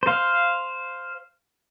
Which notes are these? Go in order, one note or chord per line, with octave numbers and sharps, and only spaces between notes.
C5 F5